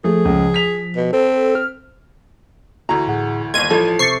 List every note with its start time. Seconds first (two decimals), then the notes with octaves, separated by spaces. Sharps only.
0.04 F3 A3 G#4
0.25 C#2
0.54 B6 F7
0.96 B2
1.13 C4 A4
1.55 F6
2.89 D2 E3 F#4 A#5
3.08 A2 G#4 F#5
3.54 G1 D#2 D#5 C6 G#6 D#7
3.70 A1 F3 A4
3.99 C3 C5 C#6 A6 C7